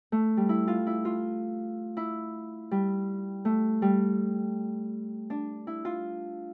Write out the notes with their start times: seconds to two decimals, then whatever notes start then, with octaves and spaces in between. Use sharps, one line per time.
0.12 A3
0.37 G3
0.49 E4
0.68 F4
0.87 E4
1.05 F4
1.97 E4
2.71 G3
3.45 A3
3.82 G3
5.30 D4
5.67 E4
5.85 F4